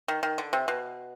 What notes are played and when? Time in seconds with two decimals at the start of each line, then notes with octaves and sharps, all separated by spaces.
0.08 D#3
0.23 D#3
0.38 D3
0.53 C3
0.68 B2